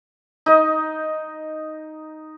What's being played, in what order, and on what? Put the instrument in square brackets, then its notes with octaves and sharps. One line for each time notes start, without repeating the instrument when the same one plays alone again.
[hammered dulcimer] D#4 D#5